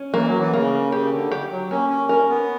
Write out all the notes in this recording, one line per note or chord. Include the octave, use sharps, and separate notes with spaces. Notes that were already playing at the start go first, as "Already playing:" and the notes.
Already playing: C#4
E3 A#3
F#3
E3
C#3 A#3
C#3 G4
D3
G4
F#3
A#3 C#4
C#4
C#4 A#4
B3